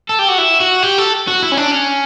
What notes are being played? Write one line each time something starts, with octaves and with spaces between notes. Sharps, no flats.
A4
G4
F#4
E4
F#4
G4
A4
F#4
E4
C#4
D4
C#4